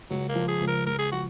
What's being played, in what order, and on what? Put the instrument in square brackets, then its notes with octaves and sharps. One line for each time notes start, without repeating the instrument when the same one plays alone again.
[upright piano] C#2 [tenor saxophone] F#3
[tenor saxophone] A#3
[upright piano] F3
[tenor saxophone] G#4
[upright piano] C#2
[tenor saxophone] A#4
[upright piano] C#2 [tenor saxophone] A#4
[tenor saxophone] G#4
[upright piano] F3 [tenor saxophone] F#4